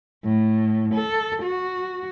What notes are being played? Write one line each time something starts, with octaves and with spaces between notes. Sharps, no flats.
A2
A4
F#4